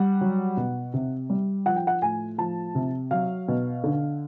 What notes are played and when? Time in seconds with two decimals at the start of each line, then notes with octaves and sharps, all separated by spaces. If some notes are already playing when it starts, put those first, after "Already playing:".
Already playing: G3 F#5
0.21 F#3
0.57 B2
0.94 C3
1.30 G3
1.66 F3 F#5
1.76 G5
1.87 F#5
2.02 A2 G#5
2.38 F3 A5
2.75 C3
3.11 F#3 F5
3.48 B2
3.84 D3